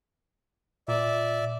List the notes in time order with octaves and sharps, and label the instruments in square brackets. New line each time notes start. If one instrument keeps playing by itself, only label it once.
[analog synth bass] A#2 [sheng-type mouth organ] D5 E5